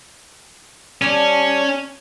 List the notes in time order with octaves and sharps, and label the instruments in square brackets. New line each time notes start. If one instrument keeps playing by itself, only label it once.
[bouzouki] G3 C#5 A5 [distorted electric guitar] C#4